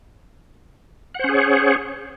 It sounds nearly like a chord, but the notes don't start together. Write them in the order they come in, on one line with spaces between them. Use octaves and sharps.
F#5 C5 C#4 G#4 C#5